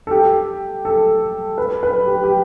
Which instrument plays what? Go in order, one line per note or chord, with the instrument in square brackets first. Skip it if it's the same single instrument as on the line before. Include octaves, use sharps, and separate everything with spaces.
[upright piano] A4
G4
A4
B4
B4
G4
G4